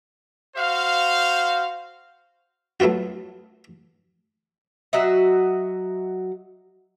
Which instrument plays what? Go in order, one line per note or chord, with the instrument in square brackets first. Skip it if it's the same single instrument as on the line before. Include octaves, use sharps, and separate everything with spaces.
[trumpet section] F#4 C5 F5
[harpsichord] F#3 A3 B3 F4 F#4
[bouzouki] F#3 F#4 D#5 E5